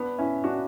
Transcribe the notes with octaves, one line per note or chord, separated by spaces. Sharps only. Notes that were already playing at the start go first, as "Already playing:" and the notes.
Already playing: B3 D4
C#4 E4
D4 F#4